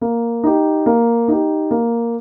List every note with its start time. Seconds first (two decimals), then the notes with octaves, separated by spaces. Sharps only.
0.01 A#3
0.44 D#4 G4
0.86 A#3
1.28 D#4 G4
1.71 A#3